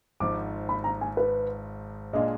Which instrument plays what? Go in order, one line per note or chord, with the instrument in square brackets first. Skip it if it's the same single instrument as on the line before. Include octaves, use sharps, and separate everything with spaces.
[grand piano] G#1 G#2 F3 [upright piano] D6
[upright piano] B5
A#5
G#5
B4
[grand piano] A#2 G#3 D4 F4 [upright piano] D#5